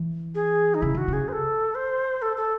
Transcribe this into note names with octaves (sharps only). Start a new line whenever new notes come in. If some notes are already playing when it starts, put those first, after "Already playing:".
Already playing: E3
G#4
D#4
C#3 E4
D#3 F#4
C#3
G#4
C5
A4
C5
A4
A4